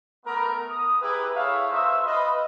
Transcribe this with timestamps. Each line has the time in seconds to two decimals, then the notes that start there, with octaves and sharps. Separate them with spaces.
0.25 A3 B3 A#4
0.69 D#6
1.01 E4 G4 G#4 A#4 B4
1.35 A3 E4 G#4 C#5 E5 F5
1.71 D#4 F4 B4 C5 E5
2.05 F4 B4 D#5